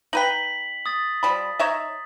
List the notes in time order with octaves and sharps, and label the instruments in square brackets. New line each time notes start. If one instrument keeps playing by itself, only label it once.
[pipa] D#4 B4 G5 [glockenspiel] B6 F#7
[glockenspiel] D#6 A6
[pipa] F3 G3 B5
D#4 C#5 E5